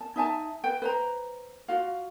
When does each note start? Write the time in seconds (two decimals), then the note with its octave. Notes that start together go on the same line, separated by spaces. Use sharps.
0.01 A5
0.16 D#4 E5 G#5 A5
0.64 B4 G5
0.82 B4 C5 A#5
1.68 F4 F#4 F5